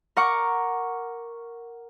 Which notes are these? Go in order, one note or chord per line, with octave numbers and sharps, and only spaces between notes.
A#4 F#5 C#6 D6